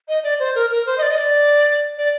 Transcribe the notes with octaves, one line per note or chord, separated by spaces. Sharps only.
D#5
D5
C5
A#4
A#4
C5
D#5
D5
D#5
D5
D5